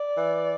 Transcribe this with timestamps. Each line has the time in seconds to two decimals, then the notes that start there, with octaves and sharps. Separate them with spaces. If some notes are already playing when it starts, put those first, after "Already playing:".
Already playing: D5
0.16 E3